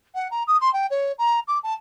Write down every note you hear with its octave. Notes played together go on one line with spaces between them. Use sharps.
F#5
A#5
D#6
C6
G5
C#5
A#5
D6
A5